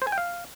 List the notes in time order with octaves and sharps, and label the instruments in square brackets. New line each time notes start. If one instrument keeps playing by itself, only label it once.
[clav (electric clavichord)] C5
G#5
G5
F5